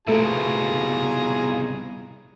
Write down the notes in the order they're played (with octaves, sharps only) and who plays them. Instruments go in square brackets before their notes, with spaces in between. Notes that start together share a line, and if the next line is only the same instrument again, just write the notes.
[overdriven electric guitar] C2 B2 [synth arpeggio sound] A3 A4 E5 [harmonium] F4 [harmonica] G#4 A#5